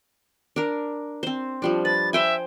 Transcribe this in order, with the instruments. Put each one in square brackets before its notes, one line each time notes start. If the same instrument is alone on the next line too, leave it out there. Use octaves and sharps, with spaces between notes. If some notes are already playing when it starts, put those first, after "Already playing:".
[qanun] D4 A#4
C4 C5
F3 G3 D4
[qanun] B4 [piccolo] A6
[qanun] C5 G5 G#5 [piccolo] E5